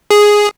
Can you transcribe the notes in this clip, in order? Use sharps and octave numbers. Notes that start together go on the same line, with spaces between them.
G#4